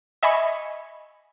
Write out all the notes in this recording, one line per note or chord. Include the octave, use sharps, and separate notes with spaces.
D#5 E5 G#5 B5 C#6